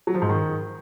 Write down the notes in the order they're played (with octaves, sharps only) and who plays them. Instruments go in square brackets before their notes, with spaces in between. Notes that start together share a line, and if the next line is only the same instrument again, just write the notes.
[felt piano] F#3
F3
G#2
D#3